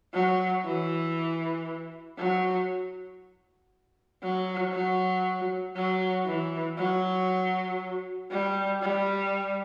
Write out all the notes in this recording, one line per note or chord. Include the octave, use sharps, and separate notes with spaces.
F#3
E3
F#3
F#3
F#3
F#3
E3
F#3
G3
G3